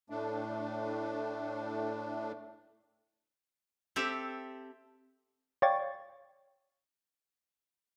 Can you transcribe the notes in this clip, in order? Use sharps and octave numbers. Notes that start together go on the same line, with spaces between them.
A2 A3 D4
C4 G4 A4 E5
C#5 D5 F5 G5 C#6 A6